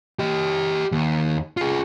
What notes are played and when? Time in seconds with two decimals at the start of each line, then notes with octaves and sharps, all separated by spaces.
0.19 G4 D#5
0.92 D#2
1.57 F4 G#4